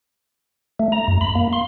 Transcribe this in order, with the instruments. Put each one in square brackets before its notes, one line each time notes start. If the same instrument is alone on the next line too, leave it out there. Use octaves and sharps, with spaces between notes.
[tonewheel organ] A3
A#5
F#2
B5
A#3
C6